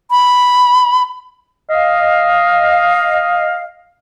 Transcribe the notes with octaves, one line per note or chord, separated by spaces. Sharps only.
B5
D#5 F5